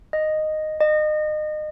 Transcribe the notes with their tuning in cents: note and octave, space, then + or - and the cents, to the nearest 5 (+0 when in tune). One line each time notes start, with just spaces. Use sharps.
D#5 -5
D#5 -30